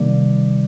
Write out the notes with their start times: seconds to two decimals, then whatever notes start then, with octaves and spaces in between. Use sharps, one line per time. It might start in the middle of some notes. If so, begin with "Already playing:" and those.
Already playing: C3 D#3 G3 A#3 D5